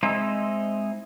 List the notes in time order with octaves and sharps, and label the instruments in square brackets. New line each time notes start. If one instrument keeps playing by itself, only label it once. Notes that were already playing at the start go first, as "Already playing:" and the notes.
[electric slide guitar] G#3 C4 D#4 E4 C5